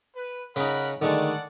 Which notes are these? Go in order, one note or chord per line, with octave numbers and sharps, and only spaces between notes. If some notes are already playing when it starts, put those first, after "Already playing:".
B4
C#3 D#4 A#4 F#5 B5
D3 D#3 G#3 A3 A4 D5 F#5